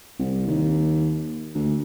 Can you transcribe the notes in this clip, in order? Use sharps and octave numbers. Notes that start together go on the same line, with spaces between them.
C2
D#2
D2